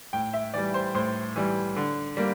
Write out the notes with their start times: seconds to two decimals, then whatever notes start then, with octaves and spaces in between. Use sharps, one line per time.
0.13 A2 G5
0.34 E5
0.54 E3 G3 D5
0.74 C5
0.94 A2 C5
1.36 E3 G3
1.76 D3
2.17 G3 A#3